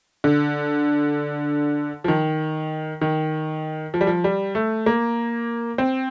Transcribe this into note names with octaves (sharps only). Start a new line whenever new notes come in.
D3
F3
D#3
D#3
F3
G3
F3
G3
A3
A#3
C4